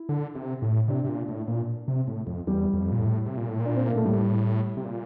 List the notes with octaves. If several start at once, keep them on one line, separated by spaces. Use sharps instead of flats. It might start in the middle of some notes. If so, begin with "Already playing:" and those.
Already playing: E4
D3
C3
A2
C3 D4
C3
A#2
A2
A#2
C3
A2
F2
E2 G3
F2
A#2
A2
C3
A#2
A2
A#2
D4
C4
A#3
A3
A2 G3
C3
A#2